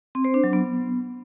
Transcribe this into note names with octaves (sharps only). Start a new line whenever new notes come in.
C4
C5
D4
F#3
B3